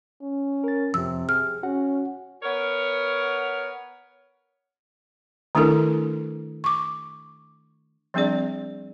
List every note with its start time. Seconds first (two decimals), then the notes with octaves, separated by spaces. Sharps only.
0.22 C#4
0.64 A#4 A6
0.94 F2 C3 F3 E6
1.29 G#4 F6
1.63 C#4 F#4 F#5
2.43 B3 A#4 C#5
5.55 D#3 A3 D4 E4 A4 A#4
6.64 C#6 D6
8.14 F3 G3 C4 D4 G#4 D5